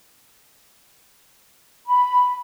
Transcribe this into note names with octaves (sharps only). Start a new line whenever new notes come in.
B5